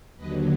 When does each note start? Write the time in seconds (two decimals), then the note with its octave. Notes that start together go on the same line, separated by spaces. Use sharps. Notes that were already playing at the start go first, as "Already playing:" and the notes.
0.16 D#2 D3 F#3 B4 D#5